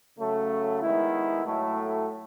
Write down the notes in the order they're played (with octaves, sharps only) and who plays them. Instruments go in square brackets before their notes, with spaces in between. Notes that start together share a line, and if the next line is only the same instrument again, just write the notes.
[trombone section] C#3 F#3 A3
D#3 G#3 B3 E4
A2 F#3 A3